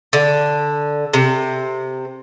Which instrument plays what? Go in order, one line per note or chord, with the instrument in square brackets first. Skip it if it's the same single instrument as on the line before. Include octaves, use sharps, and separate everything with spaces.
[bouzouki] D3
C3